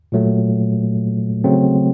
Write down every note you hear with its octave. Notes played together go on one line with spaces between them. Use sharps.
A#2 F#3 A3
C#3 F#3 A3 C4